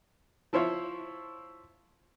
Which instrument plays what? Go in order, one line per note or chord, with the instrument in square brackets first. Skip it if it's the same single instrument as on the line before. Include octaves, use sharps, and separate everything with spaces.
[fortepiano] F3 E4 C5 C#5 F5